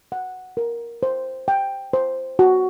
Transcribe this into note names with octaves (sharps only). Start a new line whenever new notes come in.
F#5
A#4
C5
G5
C5
F#4